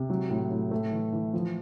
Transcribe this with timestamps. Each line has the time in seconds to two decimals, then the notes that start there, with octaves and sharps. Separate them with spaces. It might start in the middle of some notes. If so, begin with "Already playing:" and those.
Already playing: C3
0.10 F#3
0.30 A2
0.51 A2
0.71 A3
0.92 E3
1.13 E3
1.33 F3